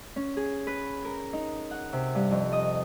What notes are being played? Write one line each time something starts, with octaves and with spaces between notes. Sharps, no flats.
C#4
G#4
B4
A#4
D#4
F#5
C3
G2
F2
D#5